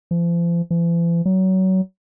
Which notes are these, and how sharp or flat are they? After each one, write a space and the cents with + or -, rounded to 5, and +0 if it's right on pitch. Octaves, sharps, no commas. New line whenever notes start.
F3 -40
E3 +45
F#3 +25